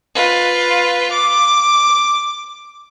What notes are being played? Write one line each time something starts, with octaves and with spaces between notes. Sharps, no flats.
F4 B4
D6